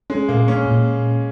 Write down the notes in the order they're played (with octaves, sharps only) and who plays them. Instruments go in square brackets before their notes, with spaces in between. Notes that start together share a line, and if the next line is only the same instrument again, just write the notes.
[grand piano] G#3 [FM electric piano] C#4
[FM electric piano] A#2 [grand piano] A#3
[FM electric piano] A#3 [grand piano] C#4
[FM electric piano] A#2